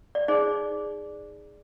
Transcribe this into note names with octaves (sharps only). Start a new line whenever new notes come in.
D5
D#4 G#4 C5 D5